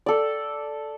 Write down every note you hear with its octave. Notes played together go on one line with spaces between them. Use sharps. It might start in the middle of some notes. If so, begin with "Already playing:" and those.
A4 D5